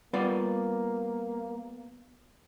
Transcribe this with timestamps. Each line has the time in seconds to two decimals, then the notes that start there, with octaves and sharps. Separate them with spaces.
0.13 G3 A#3 B3 F4 D5